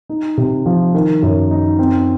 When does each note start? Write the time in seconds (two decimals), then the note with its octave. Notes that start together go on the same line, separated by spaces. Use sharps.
0.09 D#4
0.37 C3
0.66 F3
0.94 D#3
1.23 F#2
1.51 D#4
1.79 C4